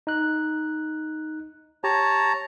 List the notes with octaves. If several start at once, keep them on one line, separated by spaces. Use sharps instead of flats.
D#4 F#6
G4 C#5 A5 A#5